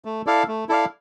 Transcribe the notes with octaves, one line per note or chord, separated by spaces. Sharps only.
A3
E4 A4 D5 F5
A3
E4 A4 D5 F5